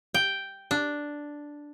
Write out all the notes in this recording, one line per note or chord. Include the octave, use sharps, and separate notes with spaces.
G5
D4